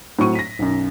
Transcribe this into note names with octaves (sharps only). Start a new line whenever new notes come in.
A2 F#3 C4 C#6 D#7
A#6 B6
B1 F#2